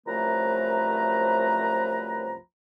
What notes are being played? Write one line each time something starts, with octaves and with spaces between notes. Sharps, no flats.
C2 F#2 F3 A3 B4 A#5